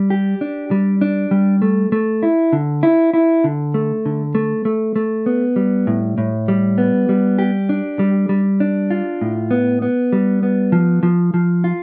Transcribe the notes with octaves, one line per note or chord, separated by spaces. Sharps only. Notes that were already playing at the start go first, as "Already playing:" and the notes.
Already playing: G3
G4
D4
G3
D4
G3
A3
A3
E4
D3
E4
E4
D3
A3
D3
A3
A3
A3
B3
G3
A2
A2
G3
B3
G3
G4
D4
G3
G3
D4
F4
A2
B3
B3
G3
B3
F3
F3
F3
F4